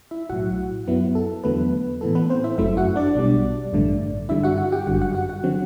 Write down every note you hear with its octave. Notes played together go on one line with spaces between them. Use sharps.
E4 E5
B1 A2 F#3 F#4 F#5
F#2 F#3 B3 E4
A4
E2 D3 F#3 A3 B3 B4
A2 E3 B3 A4
B3 B4
C4 C5
E4 E5
G1 F#2 F#3 A3 E4 E5
F#4 F#5
D4 D5
B1 B2 G3 D4
A1 G2 D3 A3
G2 D3 G3 E4 E5
F#4 F#5
F#4 F#5
G4 G5
G1 F#2 D3 G3 F#4 F#5
F#4 F#5
F#4 F#5
F#4 F#5
D3 F#3 C4